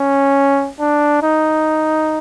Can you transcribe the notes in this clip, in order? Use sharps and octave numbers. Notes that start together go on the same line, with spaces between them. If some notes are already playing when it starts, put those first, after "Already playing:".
Already playing: C#4
D4
D#4